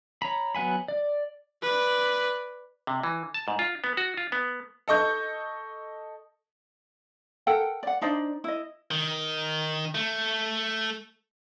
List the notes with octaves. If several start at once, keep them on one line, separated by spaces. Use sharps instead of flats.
C#5 A#5 B5
F#3 B3 F#5 G#5 B5
D5
B4 D5
C3
E3
A5
G#2
F4
B3
F#4
F4
B3
A4 D#5 C#6 G6
A4 A#4 F#5 G5
D5 F#5
D4 D#4 C5 D5
E4 D#5
D#3
A3